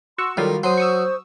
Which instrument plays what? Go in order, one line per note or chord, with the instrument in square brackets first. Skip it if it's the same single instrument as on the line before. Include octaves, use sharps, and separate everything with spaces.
[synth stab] F#4 C#6 E6 [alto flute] C6
[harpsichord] D#3 [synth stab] F#3 G3 F4 [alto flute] A4
[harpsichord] F#3 [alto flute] C5 [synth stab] C6 D#6
[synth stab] C#6 D#6 E6